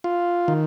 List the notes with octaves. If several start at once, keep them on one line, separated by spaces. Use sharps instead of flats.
F4
D#3